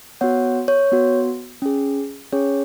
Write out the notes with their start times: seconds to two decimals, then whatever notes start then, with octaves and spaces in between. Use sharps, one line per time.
0.21 B3 F#4 C#5 F#5
0.68 C#5
0.92 B3 F#4
1.62 C#4 G#4
2.33 C#4 G#4 C#5